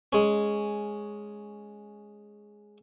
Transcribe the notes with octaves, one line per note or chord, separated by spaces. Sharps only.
G#3 C#4